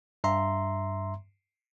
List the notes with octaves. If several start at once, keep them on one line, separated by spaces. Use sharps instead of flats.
G2 E5 A#5 C6